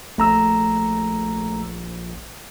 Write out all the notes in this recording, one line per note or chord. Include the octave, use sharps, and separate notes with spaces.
A#1 A3 A#5 E6